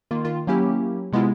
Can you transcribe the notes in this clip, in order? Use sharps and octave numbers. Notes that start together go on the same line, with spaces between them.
D#3 A#3 F4
D#3 F4
F#3 A#3 C#4 E4 G4
C3 G#3 B3 E4 F4